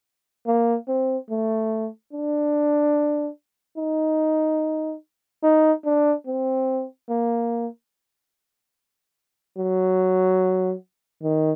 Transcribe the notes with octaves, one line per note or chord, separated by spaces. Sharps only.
A#3
C4
A3
D4
D#4
D#4
D4
C4
A#3
F#3
D#3